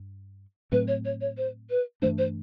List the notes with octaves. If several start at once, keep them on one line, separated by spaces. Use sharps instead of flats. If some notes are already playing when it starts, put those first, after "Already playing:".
Already playing: G2
A2 F#3 A3 C4 B4
C#5
C#5
C#5
C5
B4
G2 E3 A3 D4 C5
C5